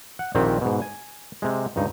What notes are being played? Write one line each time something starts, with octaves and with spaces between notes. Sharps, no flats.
F#5
A#1 A#2 D#3 C4 G4 F#5
G#2 B2
G#5
C3 G#3
C#2 G2 D#4